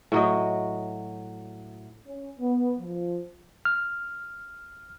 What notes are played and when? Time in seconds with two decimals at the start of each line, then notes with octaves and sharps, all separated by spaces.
0.12 A2 F#3 D#5
2.07 C#4
2.39 B3
2.79 F3
3.65 F6